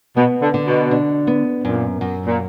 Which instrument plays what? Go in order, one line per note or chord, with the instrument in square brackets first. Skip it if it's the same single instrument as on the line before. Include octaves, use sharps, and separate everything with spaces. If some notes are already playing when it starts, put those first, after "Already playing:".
[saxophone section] B2 [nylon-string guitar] B3
[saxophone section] D3
[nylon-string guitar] D3
[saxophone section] B2
[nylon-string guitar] D4
B3
[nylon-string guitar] F#2 [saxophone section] A#2
[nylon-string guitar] F#2
[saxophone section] A#2